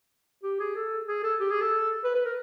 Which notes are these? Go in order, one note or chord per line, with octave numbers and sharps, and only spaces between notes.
G4
G#4
A4
G#4
A4
G4
G#4
A4
B4
B4
A#4